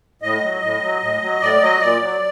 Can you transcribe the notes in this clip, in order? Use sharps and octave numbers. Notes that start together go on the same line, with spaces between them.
A2 D#5
F#3
A2
F#3
A2
F#3
A2 D5
F#3 D#5
A#2 D5
F#3